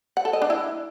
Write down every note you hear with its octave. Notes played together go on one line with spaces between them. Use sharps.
F#5
A4
D#5
D4
E4